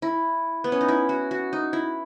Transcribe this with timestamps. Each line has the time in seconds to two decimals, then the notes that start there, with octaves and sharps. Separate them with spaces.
0.02 E4
0.64 B3
0.72 C#4
0.81 D#4
0.88 E4
1.09 F#4
1.31 F#4
1.53 D#4
1.73 E4